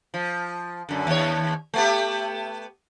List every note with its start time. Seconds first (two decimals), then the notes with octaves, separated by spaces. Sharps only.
0.14 F3
0.89 F#2 D3
1.07 D#2 C#5
1.74 A3 B3 G4